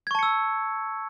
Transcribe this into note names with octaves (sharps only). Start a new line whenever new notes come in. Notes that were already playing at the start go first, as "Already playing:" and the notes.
A5 C#6 E6 G#6 C#7